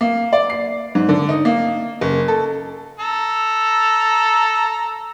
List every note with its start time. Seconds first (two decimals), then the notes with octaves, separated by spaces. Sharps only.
0.01 A#3
0.33 D5
0.50 C7
0.95 G#2
1.09 D3
1.29 D#4
1.45 A#3
2.01 F#1
2.28 A4
3.00 A4 A#5